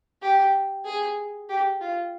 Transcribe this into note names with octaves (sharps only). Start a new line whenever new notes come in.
G4
G#4
G4
F4